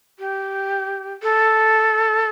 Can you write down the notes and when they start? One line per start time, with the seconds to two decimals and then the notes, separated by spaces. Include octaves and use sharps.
0.19 G4
1.23 A4